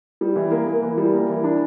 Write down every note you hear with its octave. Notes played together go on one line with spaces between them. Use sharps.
G3
E3
A#3
A#3
E3
G3
A#3
E3
D4